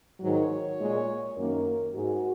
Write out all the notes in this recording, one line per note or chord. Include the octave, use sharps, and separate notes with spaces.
G#2 D#3 F#3 C#5
A#2 G#3
F#2 D#3 A#3 A#4
G#2 G#3 F#4